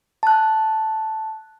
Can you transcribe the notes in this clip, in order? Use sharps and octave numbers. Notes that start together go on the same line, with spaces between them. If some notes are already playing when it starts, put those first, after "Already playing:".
A5 F#6